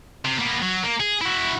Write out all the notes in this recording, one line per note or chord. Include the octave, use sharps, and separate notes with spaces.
C3
A#3 B3
F#3
A#3
G#4
E4 F#4